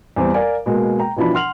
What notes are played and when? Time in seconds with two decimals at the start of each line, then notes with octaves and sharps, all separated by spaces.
0.16 E2 G3 C4
0.34 A#4 D5 F5 G#5
0.66 B2 G#3 A#3
1.00 G5 A#5
1.16 B2 E3 F3 D4 B5
1.34 F#5 C6 F6 F7 F#7